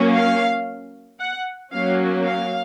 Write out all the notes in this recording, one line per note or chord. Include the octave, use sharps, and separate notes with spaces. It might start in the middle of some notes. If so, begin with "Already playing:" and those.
Already playing: F#3 A#3 C#4
F5
F#5
F#3 A#3 C#4 F5
F5